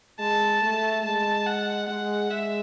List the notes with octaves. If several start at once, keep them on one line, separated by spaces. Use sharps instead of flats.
G#3 A5
A3
G#3 A5
F#5
G#3 F#5
G#3 E5